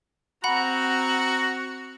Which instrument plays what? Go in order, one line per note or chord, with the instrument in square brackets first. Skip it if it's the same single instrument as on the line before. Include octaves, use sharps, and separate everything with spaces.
[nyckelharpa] C4 A#5 [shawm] F#4 [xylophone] F#5 B5